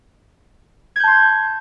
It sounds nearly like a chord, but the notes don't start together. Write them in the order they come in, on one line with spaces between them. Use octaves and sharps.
G#6 G6 A5 C6